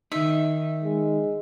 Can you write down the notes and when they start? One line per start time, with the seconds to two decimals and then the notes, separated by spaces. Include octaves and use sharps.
0.12 D#3 D#4 E5
0.84 G#3